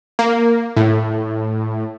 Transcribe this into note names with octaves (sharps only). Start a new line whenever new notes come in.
A#3
A2